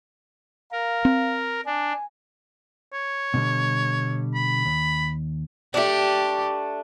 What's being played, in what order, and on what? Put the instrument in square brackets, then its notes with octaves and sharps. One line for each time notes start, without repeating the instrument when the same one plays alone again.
[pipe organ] A#4 [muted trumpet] F5
[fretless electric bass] C4
[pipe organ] D4 [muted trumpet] G#5
[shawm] C#5
[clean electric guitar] B2 D3 G3
[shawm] B5
[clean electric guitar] D#2
[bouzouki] A3 D4 [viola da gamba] G4